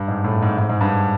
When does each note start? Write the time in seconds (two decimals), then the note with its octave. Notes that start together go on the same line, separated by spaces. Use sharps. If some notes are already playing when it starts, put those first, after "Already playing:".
Already playing: G2
0.08 G#2
0.24 A2
0.42 G#2
0.58 G#2
0.69 G#2
0.81 G2